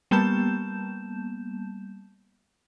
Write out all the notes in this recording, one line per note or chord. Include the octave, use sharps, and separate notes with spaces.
G3 A#3 B3 A5 G6 E7